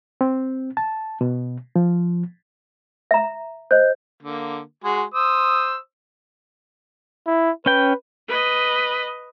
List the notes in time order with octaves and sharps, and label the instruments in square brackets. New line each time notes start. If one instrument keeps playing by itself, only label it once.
[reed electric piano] C4
A5
B2
F3
[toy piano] E5 A#5
[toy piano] C5 [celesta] D#5 F#6 G6
[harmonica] D3 A#3
G#3 F#4 G#4
C5 D#6 E6
[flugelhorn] E4
[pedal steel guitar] C#4 G5 [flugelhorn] B4
[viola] B4 D#5